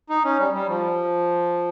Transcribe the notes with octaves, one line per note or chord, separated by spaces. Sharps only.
D#4
C#4
G3
G3
F3